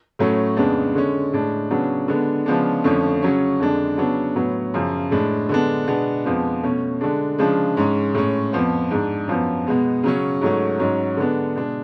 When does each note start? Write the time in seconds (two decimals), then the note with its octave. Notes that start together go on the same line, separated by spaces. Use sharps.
0.19 A2 F#3 A3 C#4
0.57 F2 C#3 G#3 B3 D4
0.95 D3 G#3 C#4
1.33 A2 G#3 D4
1.70 C#3 F#3 B3 D4
2.08 D3 G#3 B3 D4
2.46 C#3 F3 G#3 B3 D4
2.84 F2 D3 F3 A3 C#4
3.22 C#3 F#3 C#4
3.60 F2 D3 G#3 D4
3.98 C#3 F#3 B3 D4
4.36 A2 F#3 B3
4.74 F#2 C#3 F3
5.11 A2 G#3 D4
5.49 D3 G#3 B3 D4
5.88 B2 G#3 B3 D4
6.25 F2 F3 G#3 B3
6.63 B2 A3 C#4
7.01 D3 G#3 D4
7.38 C#3 F3 G#3 D4
7.77 G#2 G#3 C#4
8.14 A2 G#3 C#4
8.53 F2 F3 B3
8.91 G#2 G#3 D4
9.28 F#2 F3 B3
9.67 B2 G#3 B3
10.03 C#3 F#3 C#4
10.41 G#2 F#3 A3 C#4
10.79 G#2 F#3 C#4
11.17 D3 G#3 B3 D4
11.56 B2 G#3 D4